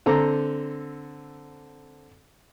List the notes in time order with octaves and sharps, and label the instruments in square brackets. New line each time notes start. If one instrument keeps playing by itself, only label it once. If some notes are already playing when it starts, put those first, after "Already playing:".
[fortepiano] D3 C4 A4 A#5